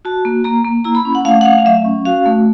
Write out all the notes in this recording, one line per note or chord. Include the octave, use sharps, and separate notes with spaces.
F#4 A5
A#3
A#3 A#5
A#3
E4 A#5
B5
C#4
F#5
A3 F5
F#5
A3 F5
F5
F#3 E5
C#4
F#4 F5
A3